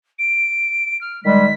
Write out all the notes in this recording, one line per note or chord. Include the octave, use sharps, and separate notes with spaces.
D7
F6
D#3 G3 G#3 B6